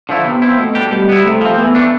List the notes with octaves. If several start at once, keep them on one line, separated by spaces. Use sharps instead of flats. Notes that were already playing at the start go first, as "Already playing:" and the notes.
D3 F3 A3 E4
C3 B3
F3 C4 E4
B2 A3
G3 D4 G4
B2 G3
B3 E4
C3 A3
F3 C4
E3 B3
A3 D4